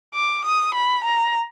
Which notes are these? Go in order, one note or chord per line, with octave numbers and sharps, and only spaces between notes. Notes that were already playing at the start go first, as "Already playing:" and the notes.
D6
D#6
B5
A#5